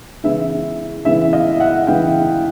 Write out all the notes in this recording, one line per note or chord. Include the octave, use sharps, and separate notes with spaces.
C#3 E3 G#3 B3 E4 E5
C#3 E3 G#3 B3 E4 E5
D#5 F5
E5 F#5
C#3 E3 G#3 B3 E4 F5 G5